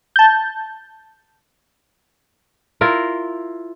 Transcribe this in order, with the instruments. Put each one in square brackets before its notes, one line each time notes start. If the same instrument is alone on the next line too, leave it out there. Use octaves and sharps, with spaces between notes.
[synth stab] A5 G6
[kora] E4 F4 A#4